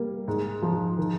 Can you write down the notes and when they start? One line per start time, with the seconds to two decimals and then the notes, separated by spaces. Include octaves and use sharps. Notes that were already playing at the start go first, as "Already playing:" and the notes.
Already playing: G3 A#3
0.28 G#2
0.62 F3
0.98 D#3